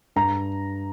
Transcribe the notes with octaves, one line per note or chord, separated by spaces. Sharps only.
G2 A#5